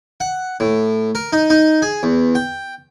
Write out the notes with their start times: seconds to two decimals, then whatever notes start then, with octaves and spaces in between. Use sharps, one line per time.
0.20 F#5
0.60 A2
1.15 A#4
1.33 D#4
1.50 D#4
1.82 G#4
2.03 E2
2.35 G5